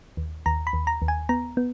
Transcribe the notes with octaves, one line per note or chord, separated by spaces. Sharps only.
D#2
D#2 A#5
B5
D#2
A#5
D#2
G#5
B3 A#5
B3